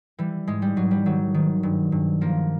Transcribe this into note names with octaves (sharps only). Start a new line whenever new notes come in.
E3 G3
G#2 G#3
G3
G#2 F#3
G3
D#3 F#3
D#3
G2
G2
F3 A#3